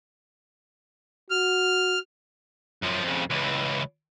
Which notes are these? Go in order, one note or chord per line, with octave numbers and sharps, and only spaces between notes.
F#4 F6
F#2 F3
F2 C#3
C#2 E3